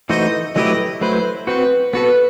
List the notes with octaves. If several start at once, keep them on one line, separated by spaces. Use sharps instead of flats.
E3 A3 D#4 F#4 C5 D#5
F#3 A3 E4 G4 B4 D#5
F#3 A3 E4 B4 C5
C4 F#4 B4 C5
B3 F#4 A4 B4